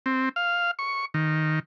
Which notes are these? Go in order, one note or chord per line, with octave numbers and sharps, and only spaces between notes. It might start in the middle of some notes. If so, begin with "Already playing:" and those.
C4
F5
C#6
D#3